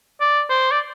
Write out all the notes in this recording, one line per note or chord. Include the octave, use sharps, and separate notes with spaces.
D5
C5
D5